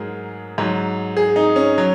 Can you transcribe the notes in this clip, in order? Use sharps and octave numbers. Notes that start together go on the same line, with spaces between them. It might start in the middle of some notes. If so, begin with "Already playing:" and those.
Already playing: G#2 F#3 G#4 A#4
G#2 F#3
G#4
D#4
C#4
F#3